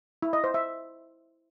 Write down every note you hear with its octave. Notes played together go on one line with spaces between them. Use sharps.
E4
D#5
C5
E5